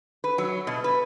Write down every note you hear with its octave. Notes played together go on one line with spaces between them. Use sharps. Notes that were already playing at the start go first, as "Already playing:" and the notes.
B4
F#3
B2
B4